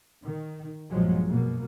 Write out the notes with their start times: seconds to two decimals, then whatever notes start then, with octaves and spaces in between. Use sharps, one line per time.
0.24 D#3
0.90 A#1 G2 A#2 F3 F#3 G#3
1.27 F#2 B2 A#3